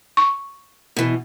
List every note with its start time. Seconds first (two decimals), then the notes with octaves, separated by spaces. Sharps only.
0.17 C#6
0.96 B2 E3